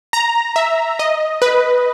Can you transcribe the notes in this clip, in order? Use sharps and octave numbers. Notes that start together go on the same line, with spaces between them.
A#5
E5
D#5
B4